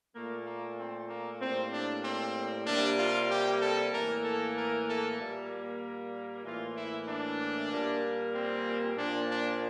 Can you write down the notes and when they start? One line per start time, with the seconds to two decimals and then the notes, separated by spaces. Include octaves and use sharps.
0.14 A#2 A3 A#3
0.46 A#3
0.78 C4
1.09 A#3
1.40 A2 G3 A#3 C4
1.72 D4
2.03 C4
2.66 C3 G3 A#3 D4
2.98 F4
3.29 G4
3.61 A4
3.92 A2 E3 A#3 A#4
4.24 A4
4.57 A#4
4.87 A4
5.19 A#2 G3 A#3
6.45 A2 E3 A#3 F4
6.76 E4
7.08 D4
7.72 A#2 G3 A#3
8.34 C4
8.97 A#2 F3 A#3 D4
9.30 D4